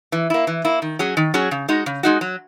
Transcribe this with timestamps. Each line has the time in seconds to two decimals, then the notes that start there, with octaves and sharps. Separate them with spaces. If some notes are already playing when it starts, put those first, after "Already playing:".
0.12 E3
0.30 A#3 E4
0.47 E3
0.65 A#3 E4
0.82 D#3
0.99 F#3 C#4 G#4
1.17 D#3
1.34 F#3 C#4 G#4
1.51 C#3
1.68 G#3 D#4 F#4
1.86 C#3
2.03 G#3 D#4 F#4
2.21 F#3